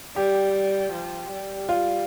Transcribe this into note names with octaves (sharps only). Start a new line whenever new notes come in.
G3 G4
F3
G3
F4